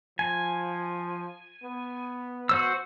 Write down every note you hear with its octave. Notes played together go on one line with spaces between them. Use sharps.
F3 G#5
B3
F#4 C5 E6